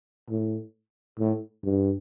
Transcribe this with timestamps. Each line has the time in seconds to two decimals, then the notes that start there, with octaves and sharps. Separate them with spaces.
0.30 A2
1.19 A2
1.64 G2